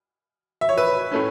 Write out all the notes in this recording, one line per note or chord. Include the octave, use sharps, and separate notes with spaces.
E5
C#5
B4 E5
A2 A3 C#4